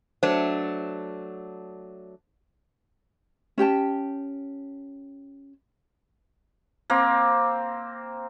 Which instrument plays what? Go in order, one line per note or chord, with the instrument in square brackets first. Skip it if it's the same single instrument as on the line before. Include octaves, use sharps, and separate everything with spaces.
[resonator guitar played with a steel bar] F#3 A3 D4 [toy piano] C5
[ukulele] C#4 G4 G5 A5
[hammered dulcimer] A#3 C4